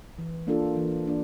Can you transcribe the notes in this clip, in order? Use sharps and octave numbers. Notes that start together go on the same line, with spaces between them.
E3
A#3 D4 F4 A4
E3
A#3 D4